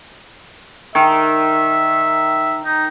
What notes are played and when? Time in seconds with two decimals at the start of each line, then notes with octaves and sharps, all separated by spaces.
0.95 D#3 E5
2.65 D#4